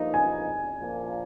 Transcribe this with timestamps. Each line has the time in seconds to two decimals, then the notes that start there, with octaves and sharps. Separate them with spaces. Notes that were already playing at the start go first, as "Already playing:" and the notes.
Already playing: G2 F3 A#3 D#4
0.14 G#5
0.80 A#1 A#2 F3 A#3